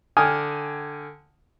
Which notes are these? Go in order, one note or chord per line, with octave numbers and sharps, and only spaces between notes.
D3 G5 G#5 D#6 F6